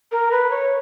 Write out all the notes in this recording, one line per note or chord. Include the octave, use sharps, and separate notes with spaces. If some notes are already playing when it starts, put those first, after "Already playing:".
A#4
B4
C#5